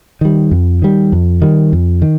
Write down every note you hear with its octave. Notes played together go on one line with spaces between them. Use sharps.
D#3 G3
F2
D#3 G3
F2
D#3 G3
F2
D#3